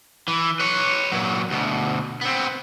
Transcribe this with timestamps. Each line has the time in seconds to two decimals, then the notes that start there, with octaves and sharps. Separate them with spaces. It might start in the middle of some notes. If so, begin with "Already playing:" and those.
0.28 E3
0.59 B4 C#5
1.12 A#2 F#3
1.50 D2 B2
2.21 B3 C4